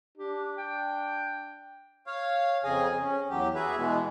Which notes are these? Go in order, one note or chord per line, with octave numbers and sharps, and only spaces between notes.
D4 G4
G5
C#5 F5
F2 C#3 G#4 D#5 G#5
C#4
E2 F#3 G4
F#4 G#4 B4 E5
B2 E3 G#3 B3